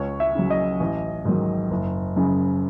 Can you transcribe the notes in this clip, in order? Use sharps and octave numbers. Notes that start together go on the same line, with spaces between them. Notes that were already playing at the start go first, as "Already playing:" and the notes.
Already playing: C#2 C#5
E5
C#3 F#3
D#5
A1
G#2 D#3 F#3
F#1
F#2 C#3